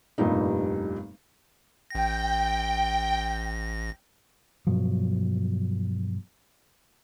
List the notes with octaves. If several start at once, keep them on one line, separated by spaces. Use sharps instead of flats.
F1 G2 A#2 G3 D#4
A1 G5 A#6
G2 B2 F3 F#3